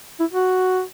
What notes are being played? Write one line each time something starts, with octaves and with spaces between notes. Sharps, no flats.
E4
F#4